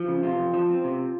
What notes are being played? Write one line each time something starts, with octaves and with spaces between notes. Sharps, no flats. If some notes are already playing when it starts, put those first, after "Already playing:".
Already playing: F3
C#3
C3 F4
F2
F3
C4
C3